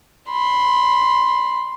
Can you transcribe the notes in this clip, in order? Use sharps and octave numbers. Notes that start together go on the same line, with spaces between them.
B5 C6